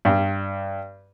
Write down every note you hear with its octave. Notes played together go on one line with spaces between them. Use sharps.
G2